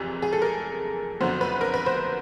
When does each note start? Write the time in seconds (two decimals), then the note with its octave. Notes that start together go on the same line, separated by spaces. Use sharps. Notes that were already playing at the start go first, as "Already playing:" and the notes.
Already playing: F#1 F2 C3 E3 G#4
0.22 G#4
0.33 A4
0.42 A#4
1.21 F#1 F2 D3 F#3 B3 C5
1.41 B4
1.61 A#4
1.74 B4
1.86 C5